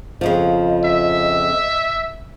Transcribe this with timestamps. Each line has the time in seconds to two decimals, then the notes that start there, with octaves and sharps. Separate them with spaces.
0.21 F2 C#3 F3 D#5
0.85 E5